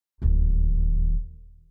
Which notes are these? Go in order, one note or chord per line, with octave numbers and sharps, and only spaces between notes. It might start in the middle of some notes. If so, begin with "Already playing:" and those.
D1 D#2